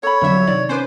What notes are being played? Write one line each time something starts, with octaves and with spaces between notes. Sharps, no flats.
A4 C#5 B5
G1 F2 D3 F#3 E5
C3 D#3 D5
C#4 B4 C5 D6